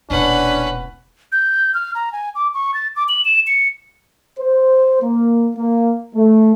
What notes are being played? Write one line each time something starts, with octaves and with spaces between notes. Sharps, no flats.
E1 A#2 C#4 D4 B4 F#5
G6
F6
A#5
G#5
D6
C#6
A6
D6
F#7
E7
C#7
C5
A#3
A#3
A3